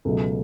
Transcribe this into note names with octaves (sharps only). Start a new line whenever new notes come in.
C#2 B2 F#3 A3